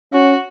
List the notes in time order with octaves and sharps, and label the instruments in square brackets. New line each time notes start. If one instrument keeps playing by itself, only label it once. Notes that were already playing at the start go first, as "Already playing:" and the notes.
[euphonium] C#4 [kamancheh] F#4